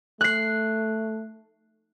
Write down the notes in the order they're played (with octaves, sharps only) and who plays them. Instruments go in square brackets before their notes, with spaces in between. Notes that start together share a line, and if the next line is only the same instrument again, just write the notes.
[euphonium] A3 [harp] F#6 C7